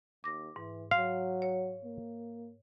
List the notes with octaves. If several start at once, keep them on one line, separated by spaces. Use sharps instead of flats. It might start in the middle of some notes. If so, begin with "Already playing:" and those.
D#2 D6 A#6
G#2 E3
F#3 F5 C6
C#5
A#3